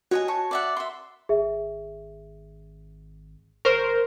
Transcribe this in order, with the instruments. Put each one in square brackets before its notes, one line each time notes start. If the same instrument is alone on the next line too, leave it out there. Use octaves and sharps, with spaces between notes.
[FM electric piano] F#4 [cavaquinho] C#5 D#5 G#5
[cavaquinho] C#5 A5 C#6
D5 E5 F#5
E5 C6
[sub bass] G#1 [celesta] G#4 E5
[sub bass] G1 [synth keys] A#4 C5 [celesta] C#6 F6